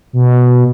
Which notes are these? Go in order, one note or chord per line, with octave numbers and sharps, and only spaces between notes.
B2